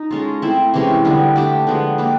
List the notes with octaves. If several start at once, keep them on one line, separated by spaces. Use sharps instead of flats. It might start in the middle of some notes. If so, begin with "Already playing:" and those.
Already playing: D#4
G#3 C#4 F4 A4
A3 C4 E4
C3 E3 G#3 C#4
D3 G3 B3
A3 D4 G4
D3 F3 G#3 B3
A#3 D4 G4 B4